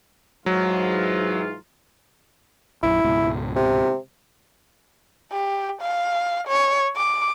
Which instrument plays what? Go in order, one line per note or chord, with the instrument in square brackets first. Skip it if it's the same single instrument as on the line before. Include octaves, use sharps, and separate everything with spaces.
[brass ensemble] G#2 E3 F4 [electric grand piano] F#3
[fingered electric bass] A#1 F#2 [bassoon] E4
[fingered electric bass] C#2 G#2 B2
[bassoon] C3
[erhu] G4
F5
C#5
D6